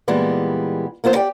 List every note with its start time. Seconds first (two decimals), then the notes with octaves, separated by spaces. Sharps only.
0.08 A#2 E3 G3 G#3 B3
1.04 A#3 B3 F4 C5
1.15 G4 D5 G5